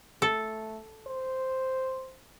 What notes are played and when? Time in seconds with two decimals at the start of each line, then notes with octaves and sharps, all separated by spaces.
0.22 A3 A4
1.07 C5